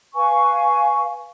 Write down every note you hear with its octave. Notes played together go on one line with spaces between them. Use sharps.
B4 F5 G#5 C#6